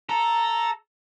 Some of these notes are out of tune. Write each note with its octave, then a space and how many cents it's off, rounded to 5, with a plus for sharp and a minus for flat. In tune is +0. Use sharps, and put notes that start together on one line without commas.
A4 +0 A#5 +0